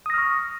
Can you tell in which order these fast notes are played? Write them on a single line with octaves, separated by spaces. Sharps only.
D#6 A#6 F6 C#6